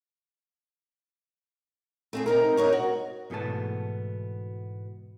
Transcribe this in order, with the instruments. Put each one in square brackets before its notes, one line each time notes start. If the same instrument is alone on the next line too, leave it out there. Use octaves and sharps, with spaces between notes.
[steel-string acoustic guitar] A3 C4 G#4
C3 D#4 A#4
D#4 A#4 C#5
F#4
[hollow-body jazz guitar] G#2 B2 E3 A3 B3 A5